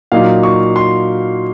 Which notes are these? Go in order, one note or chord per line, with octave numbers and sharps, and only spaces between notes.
A#2 F#3 A#3 D#4 F5
C#6
C6